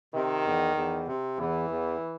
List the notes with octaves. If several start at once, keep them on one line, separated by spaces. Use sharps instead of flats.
C3 D#3
E2
E2
C3
E2 E3
E2